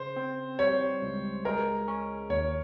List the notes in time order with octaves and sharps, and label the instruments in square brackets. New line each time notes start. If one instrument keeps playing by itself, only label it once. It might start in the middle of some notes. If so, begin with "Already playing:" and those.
Already playing: [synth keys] C#3 [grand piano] C5
[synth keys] C4
[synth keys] G3 [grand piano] C#5
[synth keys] C#2
[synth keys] G#3 [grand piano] A#4
[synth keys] C#4
[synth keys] D#2 [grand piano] C#5